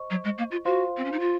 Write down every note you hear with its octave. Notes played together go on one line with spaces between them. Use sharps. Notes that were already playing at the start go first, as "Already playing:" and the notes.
Already playing: C5 D#5 C#6
F#3
G#3
A#3
F4
F4 F#4 C5 F5 C6
C4
C#4
D#4
F4